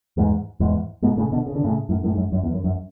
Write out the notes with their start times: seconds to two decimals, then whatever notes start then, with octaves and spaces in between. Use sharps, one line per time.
0.17 E2 G#2
0.60 E2 G#2
1.02 G#2 B2
1.17 A2 C#3
1.32 B2 D3
1.46 C#3
1.55 D3
1.64 A2 C#3
1.89 F#2 A2
2.03 F#2 A2
2.12 G#2
2.17 F#2
2.32 F#2
2.43 E2
2.53 F#2
2.64 F#2